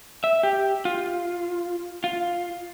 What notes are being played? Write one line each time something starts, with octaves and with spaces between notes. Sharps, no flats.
E5
G4
F4
F4